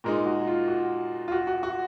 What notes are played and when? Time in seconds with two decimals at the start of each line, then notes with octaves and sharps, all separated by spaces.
0.04 A#2 G#3 D#4 A#4
0.26 F#4
0.47 F4
0.68 F#4
1.28 F4
1.32 F#4
1.47 F#4
1.63 F#4